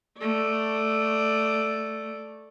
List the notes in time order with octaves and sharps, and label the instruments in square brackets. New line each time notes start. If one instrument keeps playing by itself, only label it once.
[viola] A3 D5